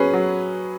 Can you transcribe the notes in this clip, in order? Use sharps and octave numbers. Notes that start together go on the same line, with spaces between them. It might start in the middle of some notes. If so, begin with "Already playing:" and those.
Already playing: F#3 C#4 G#4 B4
F#3